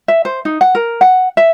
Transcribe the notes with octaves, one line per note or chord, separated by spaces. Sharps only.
E5
C5
D#4
F#5
A#4
F#5
E5